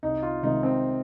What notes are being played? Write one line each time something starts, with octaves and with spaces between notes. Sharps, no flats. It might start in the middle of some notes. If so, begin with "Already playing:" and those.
C2 D#4
F4
C3 D#3 G#3 D#4
C4